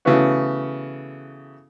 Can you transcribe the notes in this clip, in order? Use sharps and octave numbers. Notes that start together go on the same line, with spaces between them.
C#3 E3 A3 B3 F#4